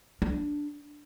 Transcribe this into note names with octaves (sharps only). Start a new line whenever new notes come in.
D4